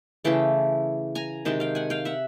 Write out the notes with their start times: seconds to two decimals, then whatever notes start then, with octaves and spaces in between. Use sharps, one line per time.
0.25 C#3 E3 A3 G5 A5
1.15 G#5 A#5
1.45 C3 D#3 G#3 G5 A5
1.60 F5 G5
1.75 F#5 G#5
1.90 F5 G5
2.05 E5 F#5